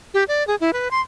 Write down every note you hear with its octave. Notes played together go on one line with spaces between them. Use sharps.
G4
D5
G#4
E4
B4
C6